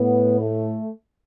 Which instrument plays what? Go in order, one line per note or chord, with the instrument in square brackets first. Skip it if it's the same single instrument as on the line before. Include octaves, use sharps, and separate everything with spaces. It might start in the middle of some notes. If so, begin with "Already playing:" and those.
Already playing: [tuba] A2 [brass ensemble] B3
[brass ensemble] A3